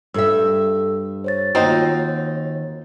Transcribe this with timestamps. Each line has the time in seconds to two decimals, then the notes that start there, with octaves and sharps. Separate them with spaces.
0.14 G2 A4 E5 E6
1.24 C5 C#5 A6
1.55 D#2 C4 D#4 F4 F#4